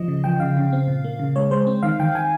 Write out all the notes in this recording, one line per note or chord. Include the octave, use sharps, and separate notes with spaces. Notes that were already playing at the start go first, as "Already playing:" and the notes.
Already playing: F3 D#5
C#3
F3 G5
C#3 F5
C#3
C4
A#2
A#3
C#3
G#3 C#5
G#3 C5
C4
D#3 F5
D#3 G5
D#3 G#5